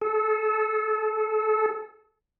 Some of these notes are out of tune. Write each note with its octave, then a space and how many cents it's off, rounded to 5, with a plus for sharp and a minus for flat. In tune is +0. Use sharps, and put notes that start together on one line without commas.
A4 -30